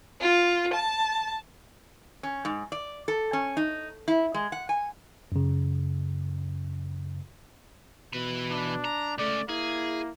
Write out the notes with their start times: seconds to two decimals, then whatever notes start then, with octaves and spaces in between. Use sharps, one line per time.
0.21 F4
0.74 A5
2.23 C#4
2.45 G#2
2.72 D5
3.08 A4
3.33 C#4
3.57 D#4
4.08 E4
4.34 G#3
4.52 F#5
4.69 G#5
5.32 F#2 C#3
8.13 B2 E3 B5
8.51 D4
8.85 A#5
9.18 C#2 A3 C#4 D5
9.49 A#3 E4 G#4